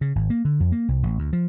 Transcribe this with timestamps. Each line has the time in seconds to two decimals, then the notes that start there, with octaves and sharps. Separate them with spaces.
0.01 C#3
0.15 G#1
0.30 A#3
0.45 D3
0.60 F2
0.72 A#3
0.88 C2
1.03 A1
1.19 D2
1.33 F3